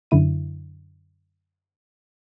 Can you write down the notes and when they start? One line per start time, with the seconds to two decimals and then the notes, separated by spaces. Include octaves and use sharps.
0.11 F#2 D3 E4 D#7